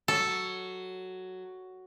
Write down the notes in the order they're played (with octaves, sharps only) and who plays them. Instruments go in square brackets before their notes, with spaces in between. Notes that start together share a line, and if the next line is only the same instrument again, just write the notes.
[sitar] F#3 [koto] A4